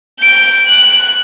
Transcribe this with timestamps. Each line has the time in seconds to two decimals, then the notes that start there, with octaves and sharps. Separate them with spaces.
0.19 G6 D7
0.66 F#6